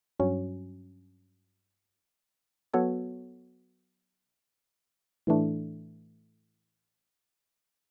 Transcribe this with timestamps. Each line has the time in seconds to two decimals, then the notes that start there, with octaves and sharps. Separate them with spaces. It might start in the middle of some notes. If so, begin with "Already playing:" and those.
0.19 G2 F#3 C#4
2.74 F#3 B3 F#4 A4 C#5
5.27 A2 E3 A3 D4